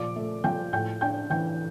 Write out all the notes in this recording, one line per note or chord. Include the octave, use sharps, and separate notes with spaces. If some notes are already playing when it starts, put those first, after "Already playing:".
Already playing: A#2 F3 D5 D6
A3
F3 G5 G6
A2 G5 G6
D4 G5 G6
E3 G5 G6